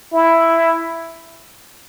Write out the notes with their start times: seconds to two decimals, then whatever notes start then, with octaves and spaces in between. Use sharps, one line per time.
0.13 E4